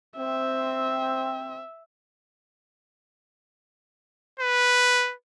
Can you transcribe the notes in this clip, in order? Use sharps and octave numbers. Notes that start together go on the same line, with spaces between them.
C4 E5
B4